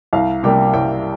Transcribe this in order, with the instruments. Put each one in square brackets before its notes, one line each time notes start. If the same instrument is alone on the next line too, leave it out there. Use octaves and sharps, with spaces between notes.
[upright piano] C2 F5
C3 G3 A#3 G5
C2 G5